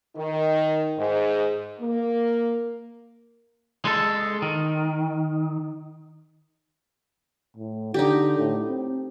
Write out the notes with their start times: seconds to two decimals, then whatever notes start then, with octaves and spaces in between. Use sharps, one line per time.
0.16 D#3
0.98 G#2
1.80 A#3
3.85 G#3 A4
4.42 D#3
7.57 A2
7.94 D3 D#4 G4
8.39 A2
8.69 C4